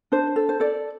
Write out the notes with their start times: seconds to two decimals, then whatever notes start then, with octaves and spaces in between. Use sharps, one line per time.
0.12 D4 C5
0.36 A4
0.49 C5
0.60 A4 D5